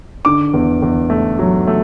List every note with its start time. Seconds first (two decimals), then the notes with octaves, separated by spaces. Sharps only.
0.25 D3 D6
0.54 E2
0.82 E2
1.10 A3
1.39 F#3
1.67 A3